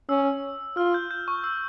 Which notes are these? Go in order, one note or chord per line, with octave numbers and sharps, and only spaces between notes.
C#4 E6
F4 F6
G6
G6
C#6
E6